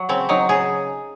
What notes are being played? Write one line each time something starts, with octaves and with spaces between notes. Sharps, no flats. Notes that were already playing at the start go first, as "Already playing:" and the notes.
Already playing: F#3
C#3 C4
F#3 D#4
C#3 G#4